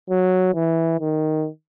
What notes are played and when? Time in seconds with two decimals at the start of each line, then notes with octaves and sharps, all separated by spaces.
0.10 F#3
0.55 E3
1.00 D#3